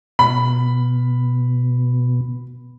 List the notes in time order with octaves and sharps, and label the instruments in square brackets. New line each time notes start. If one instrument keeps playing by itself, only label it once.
[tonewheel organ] B2 [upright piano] B5